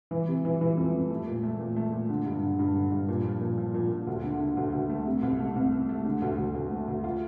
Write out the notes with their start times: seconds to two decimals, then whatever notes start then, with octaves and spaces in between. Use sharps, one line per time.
0.11 E3
0.28 C3
0.45 E3
0.61 E3
0.77 F2
0.93 F2
1.10 A3
1.27 A#2
1.43 A3
1.60 A#2
1.76 A3
1.92 A#2
2.09 D3
2.26 G2
2.43 D3
2.59 G2
2.75 D3
2.92 G2
3.09 A#2
3.24 F3
3.41 A#2
3.57 F3
3.74 A#2
3.91 A#2
4.07 D2
4.24 D3
4.40 D3
4.57 D2
4.73 D2
4.90 A3
5.06 C3
5.22 C2
5.39 A3
5.56 C2
5.72 A3
5.89 A3
6.05 D3
6.22 D2
6.38 D2
6.54 D2
6.71 A3
6.88 D2
7.04 F4